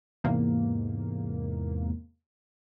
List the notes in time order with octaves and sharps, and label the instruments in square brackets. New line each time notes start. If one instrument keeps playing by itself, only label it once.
[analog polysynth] E2 G#2 C3 A#3